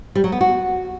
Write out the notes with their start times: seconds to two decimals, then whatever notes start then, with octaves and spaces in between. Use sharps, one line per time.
0.15 G3
0.24 F#3
0.32 B3
0.41 F#4